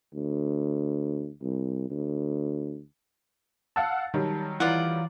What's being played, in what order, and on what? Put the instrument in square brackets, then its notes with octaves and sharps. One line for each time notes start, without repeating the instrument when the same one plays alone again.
[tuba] D2
C2
D2
[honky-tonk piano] F5 F#5 E6 [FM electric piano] A5
[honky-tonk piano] D#3 F#3 G3
[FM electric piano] E3 [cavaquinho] F4 D5 F#5